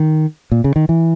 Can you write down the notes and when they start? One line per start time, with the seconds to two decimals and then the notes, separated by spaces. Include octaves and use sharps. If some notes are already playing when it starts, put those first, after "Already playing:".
Already playing: D#3
0.52 A#2
0.64 C#3
0.76 D#3
0.89 E3